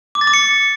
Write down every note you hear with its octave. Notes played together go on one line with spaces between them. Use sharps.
D6
A6
D6
C#7